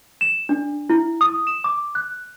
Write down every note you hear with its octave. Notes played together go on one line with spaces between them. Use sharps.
E7
D4
E4
D#6
E7
D6
F#6